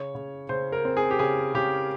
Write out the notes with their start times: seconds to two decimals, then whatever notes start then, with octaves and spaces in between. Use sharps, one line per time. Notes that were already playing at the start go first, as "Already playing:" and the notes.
Already playing: C#3 C#5
0.15 C#3
0.49 C#3 C5
0.72 A#4
0.85 C4
0.97 G#4
1.11 G4
1.19 C#3 G#4
1.54 C#3 G4